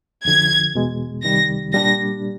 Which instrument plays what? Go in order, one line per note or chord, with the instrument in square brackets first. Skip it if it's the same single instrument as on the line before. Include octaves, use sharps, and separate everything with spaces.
[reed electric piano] F2 D3 F3 [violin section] G#6
[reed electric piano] E2 B2 G#3
[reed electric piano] C2 C3 D#3 G3 [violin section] A#6
[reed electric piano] A#2 G3 A#3 D4 G4 [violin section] A#6